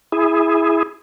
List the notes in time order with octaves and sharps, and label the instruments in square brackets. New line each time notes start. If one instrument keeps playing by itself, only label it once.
[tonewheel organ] E4 G#4